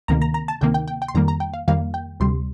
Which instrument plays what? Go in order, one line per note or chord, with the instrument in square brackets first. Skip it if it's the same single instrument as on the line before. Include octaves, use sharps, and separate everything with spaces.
[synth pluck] D2 C3 D#3 A#3 A#5
A#5
A#5
A5
D2 C3 D#3 A#3 G5
G5
G5
G5
C6
F2 D#3 G3 A#3 A#5
A#5
G5
F5
F2 D#3 G3 A#3 F5
G5
D2 C3 G3 C6